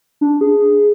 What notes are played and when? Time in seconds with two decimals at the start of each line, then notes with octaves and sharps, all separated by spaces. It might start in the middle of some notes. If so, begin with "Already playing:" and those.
0.21 D4
0.41 G#4